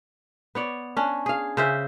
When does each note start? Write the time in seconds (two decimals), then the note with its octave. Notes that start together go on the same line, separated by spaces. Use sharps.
0.55 B3 C#5 D5
0.97 C#4 D4
1.26 G#4 F5
1.57 C#3 C5 E5